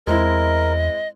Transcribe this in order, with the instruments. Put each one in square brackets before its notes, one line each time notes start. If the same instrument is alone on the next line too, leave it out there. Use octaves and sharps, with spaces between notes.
[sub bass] E2 [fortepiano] G#3 C4 E4 [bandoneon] A#4 [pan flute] D#5